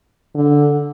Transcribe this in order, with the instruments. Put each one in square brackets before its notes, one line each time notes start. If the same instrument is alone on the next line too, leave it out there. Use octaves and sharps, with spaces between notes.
[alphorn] D3